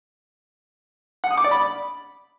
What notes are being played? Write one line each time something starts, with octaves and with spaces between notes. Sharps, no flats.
F#5
D#6
D6
D5
B5